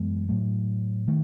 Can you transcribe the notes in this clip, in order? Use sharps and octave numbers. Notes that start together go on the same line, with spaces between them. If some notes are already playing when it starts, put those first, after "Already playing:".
Already playing: F#2 E3 G#3 B3
A2 F#3 A3
D#3 A3